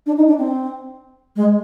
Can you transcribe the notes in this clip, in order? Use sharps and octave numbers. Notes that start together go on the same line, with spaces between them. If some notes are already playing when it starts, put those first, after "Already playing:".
D4
D#4
D4
C4
G#3